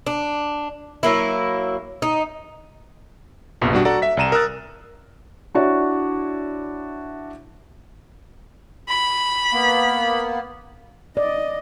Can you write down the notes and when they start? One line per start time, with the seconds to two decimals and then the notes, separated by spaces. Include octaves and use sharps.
0.07 D4
1.03 F#3 A#3 E4
2.02 D#4
3.61 A#1 F2 C3 B3
3.73 B2 G3 D4 F#4
3.85 F#4 A4 D5 F#5 A#5
4.02 E5 B6
4.17 C2 D5 A#5 D#7 E7
4.32 A#4 D#6 E6 F#6 A6
5.55 D4 E4 F#4 C#5 D5
8.88 B5
9.53 A#3 B3
11.17 D5 D#5